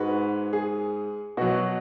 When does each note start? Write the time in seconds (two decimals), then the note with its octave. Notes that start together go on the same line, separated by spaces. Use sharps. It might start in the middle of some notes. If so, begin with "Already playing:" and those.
Already playing: G#2 G#3 F#4 B4
0.53 G#4
1.37 B2 F#3 F#4